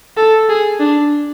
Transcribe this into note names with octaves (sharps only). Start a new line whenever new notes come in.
A4
G#4
D4